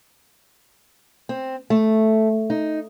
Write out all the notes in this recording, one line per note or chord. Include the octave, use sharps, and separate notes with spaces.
C4
A3
D#4